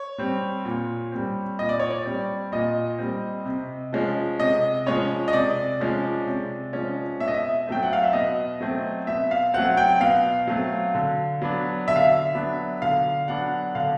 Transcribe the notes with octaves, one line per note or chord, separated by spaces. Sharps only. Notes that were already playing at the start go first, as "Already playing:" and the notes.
Already playing: C#5
G3 C4
A#2
G3 C4
A#2 D#5
D5
C#5
D5
G3 C4
A#2 D#5
G3 C4
C3
F3 G#3 C#4
C3 D#5
F3 G#3 C#4 C#5
D#5
C3 D5
F3 G#3 C#4
C3
F3 G#3 C#4
B2 E5
D#5
E5
F#3 A3 C4 G5
F#5
F5
E5
B2 D#5
F#3 A3 C4
B2 E5
F5
F#3 A3 C4 F#5
G5
B2 F5
F#3 A3 C4
D3
F#3 B3 D4
D3 E5
F5
E5
F#3 B3 D4
D3 F5
F#3 B3 D4 F#5
D3 F5